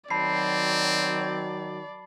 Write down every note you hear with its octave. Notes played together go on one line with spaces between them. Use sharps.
D#3 F#3 C4 D5 A5 B5 C7